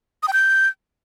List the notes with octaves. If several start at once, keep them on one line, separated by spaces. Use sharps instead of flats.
D#6
G5
G6